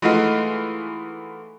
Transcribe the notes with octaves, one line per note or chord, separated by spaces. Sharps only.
E3 G#3 A3 D#4 F4 F#4